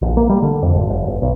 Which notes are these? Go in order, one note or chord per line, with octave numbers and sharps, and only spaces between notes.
A#1
A#3
G3
D3
F2
G#1
F#1
G1
B1